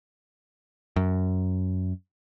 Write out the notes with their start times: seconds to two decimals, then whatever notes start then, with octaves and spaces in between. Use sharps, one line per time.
0.96 F#2